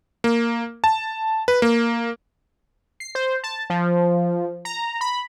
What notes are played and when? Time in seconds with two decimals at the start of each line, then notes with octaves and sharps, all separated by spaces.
0.24 A#3
0.84 A5
1.48 B4
1.62 A#3
3.00 C7
3.15 C5
3.44 A5
3.70 F3
4.65 A#5
5.01 B5